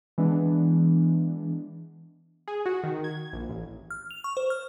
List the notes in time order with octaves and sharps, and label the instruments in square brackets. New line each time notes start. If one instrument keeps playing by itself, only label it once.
[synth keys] E3 G#3 B3 D4
G#4
F#4
D#3
G#6
A#1
A1
[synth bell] F6
F7
C#6
C5
F6